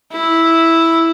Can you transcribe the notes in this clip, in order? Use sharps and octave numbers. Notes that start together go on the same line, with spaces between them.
E4